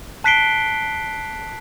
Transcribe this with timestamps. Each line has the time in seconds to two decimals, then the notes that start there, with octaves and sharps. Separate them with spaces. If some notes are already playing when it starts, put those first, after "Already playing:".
0.24 A5 F#6 B6 C7 D7 G7